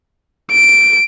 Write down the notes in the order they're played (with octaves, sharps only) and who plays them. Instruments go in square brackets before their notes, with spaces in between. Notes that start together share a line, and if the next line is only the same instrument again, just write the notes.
[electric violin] D7